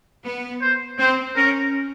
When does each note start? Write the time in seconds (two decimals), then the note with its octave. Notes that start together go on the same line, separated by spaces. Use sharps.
0.25 B3
0.61 C5
0.99 C4 C5
1.36 C#4 A#4